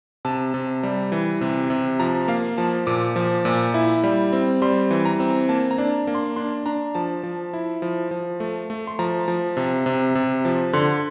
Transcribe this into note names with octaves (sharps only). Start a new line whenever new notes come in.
C3 A5
C3
G3
E3
C3
C3
F3 A#5
A#3 F5
F3 A5
A#2 D6
F3
A#2
E4
G3
C4
G3 C6
E3
A#5
C4
A#3 A5
A#5
D4
A#3
C6
D4 C6
D4 A#5
F3 A5
F3
E4
F3
F3
A3
A3
C6
F3 A#5
F3
C3
C3
C3
F3
D3 C6